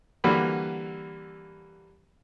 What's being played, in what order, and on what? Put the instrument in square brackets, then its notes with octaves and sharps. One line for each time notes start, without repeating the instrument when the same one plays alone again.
[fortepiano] D3 E3 G3 A#3 F#4 B5